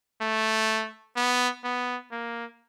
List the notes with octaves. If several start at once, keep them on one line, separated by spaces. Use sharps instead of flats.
A3
B3
B3
A#3